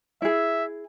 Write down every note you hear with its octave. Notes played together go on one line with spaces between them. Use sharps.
E4 G#4 E5